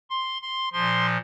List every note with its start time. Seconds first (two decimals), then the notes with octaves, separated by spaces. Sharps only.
0.10 C6
0.42 C6
0.73 A#2 F3 C6